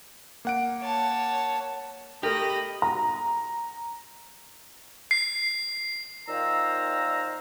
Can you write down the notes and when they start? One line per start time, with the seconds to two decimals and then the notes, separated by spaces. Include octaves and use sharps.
0.45 A#3 F#5 D7
0.82 C#5 A5
2.23 A3 G4 A#4 D#5 B5 A#6
2.82 A#5
5.11 C7
6.28 A#2 D#3 C5 F5 A#5 E6